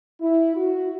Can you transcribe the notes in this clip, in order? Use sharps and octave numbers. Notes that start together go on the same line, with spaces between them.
E4
F#4